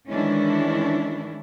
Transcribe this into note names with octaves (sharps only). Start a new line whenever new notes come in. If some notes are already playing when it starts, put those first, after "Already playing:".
D#3 E3 G#3 C#4 D4 E4